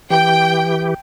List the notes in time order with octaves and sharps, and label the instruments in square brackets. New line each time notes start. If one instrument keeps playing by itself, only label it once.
[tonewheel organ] E3 G4 [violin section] G5